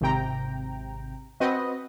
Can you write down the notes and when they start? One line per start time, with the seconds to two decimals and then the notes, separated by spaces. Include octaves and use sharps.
0.01 G#1 C3 G5 A#5
1.40 C4 F#4 B4 D#5